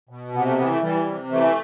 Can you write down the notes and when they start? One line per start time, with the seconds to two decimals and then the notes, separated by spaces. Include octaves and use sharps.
0.09 B2
0.34 C3 B3
0.46 A3
0.58 E3 B3
0.70 A3
0.82 E3 G3
1.06 C3
1.31 E3 A3